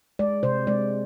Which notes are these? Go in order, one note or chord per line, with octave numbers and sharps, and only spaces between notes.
G#3 D5
C3 C5
G#3 D5